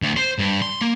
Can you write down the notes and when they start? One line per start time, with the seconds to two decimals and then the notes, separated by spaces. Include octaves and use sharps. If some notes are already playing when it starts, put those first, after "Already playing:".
0.02 D2
0.17 C5
0.39 G2
0.62 C6
0.81 A#3